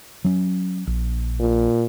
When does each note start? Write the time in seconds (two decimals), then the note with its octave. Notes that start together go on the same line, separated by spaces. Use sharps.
0.25 F#3 C#4
0.87 A#1
1.40 A#2